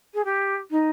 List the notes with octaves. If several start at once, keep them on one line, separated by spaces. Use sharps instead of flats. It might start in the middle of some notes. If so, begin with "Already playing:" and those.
G#4
G4
D#4